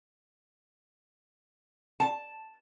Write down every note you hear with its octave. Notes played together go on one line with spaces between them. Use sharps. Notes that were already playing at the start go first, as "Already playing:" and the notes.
A5